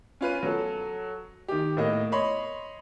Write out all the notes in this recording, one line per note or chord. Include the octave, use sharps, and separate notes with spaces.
C#4 F4 B4 D#7
F#3 A4
D#3 G4
A2 A#3 D#5
C#5 D#5 B5 C6